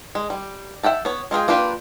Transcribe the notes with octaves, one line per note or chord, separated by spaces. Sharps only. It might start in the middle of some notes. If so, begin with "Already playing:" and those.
G#3
G3
E5 F#5 G5 A5
B3 C#5
G#3 F4 G#4 G5
A#3 D4 F4 G4 B4